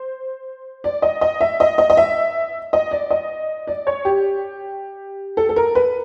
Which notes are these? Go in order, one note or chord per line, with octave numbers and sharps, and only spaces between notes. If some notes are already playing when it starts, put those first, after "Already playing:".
Already playing: C5
D5
D#5
D#5
E5
D#5
D#5
D#5
E5
D#5
D5
D#5
D5
C#5
G4
A4
A4
A#4
B4